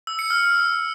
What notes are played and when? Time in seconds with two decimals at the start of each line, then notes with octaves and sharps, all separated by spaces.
0.07 E6
0.19 C#7
0.30 F6